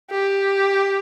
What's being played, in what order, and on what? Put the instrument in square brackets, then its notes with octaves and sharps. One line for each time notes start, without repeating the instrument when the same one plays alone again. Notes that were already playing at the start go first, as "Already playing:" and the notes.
[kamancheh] G4